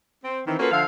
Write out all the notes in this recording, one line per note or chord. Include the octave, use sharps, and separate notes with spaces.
C4
D#3 E3 C4
A#3 C#4 F4 F#4 A4 B4
D3 F3 E5 F5